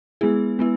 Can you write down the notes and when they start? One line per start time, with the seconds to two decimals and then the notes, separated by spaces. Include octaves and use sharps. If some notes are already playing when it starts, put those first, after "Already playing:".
0.21 G#3 B3 E4 G#4
0.59 G#3 B3 E4